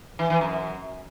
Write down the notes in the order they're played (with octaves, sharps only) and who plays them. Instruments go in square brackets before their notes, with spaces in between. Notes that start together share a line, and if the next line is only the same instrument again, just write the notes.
[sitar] E3
E3
F#2